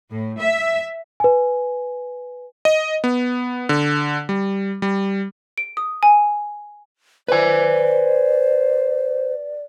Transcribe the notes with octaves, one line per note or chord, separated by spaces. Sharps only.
A2
E5
B4 G#5
D#5
B3
D3
G3
G3
D7
D#6
G#5
B4 C5 D5 G#5